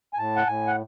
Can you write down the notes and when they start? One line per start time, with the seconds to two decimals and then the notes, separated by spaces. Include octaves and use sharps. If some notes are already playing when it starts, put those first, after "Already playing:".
0.13 G#5
0.18 A2 A5
0.36 F#5
0.47 A2 G#5
0.67 F#5